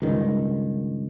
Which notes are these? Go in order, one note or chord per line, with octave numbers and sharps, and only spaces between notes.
C#2 G2 D#3